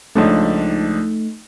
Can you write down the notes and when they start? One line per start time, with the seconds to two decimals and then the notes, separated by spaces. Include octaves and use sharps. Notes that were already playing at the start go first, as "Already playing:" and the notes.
0.15 C#2 F3 A3 D4 D#4